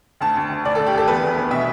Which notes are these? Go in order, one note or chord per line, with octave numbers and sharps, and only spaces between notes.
D2 A5
D2
D2
D2 D5
D2 A4
G4
D2 A4
E2 B4
E2
B3
B2 E5